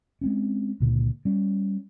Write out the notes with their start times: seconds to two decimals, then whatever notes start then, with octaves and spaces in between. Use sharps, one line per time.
0.21 G#3 C4 C#4
0.80 C#2 A#2 D3
1.25 G3 C#4